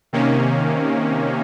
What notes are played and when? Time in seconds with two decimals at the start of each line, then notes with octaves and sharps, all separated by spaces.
0.13 C3 D#3 A#3 C#4